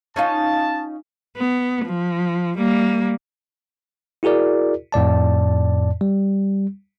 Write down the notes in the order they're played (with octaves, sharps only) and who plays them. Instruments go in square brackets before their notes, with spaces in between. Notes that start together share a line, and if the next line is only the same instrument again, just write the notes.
[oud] C#4 D#4 F4 [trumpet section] A5
[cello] B3
F3
G3 A#3
[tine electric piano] E4 F#4 G#4 A#4 D5
F2 A2 D5 A5
G3